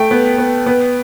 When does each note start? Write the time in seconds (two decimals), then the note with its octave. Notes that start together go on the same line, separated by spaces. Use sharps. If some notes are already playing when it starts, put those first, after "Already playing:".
Already playing: A3 G5
0.11 B3
0.38 B3
0.66 B3